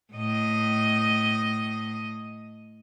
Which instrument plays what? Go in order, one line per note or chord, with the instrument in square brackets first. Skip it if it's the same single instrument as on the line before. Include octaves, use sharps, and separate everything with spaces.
[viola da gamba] A2 D#5